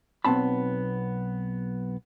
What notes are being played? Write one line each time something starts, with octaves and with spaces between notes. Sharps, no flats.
B1 B3 C4 A5 B5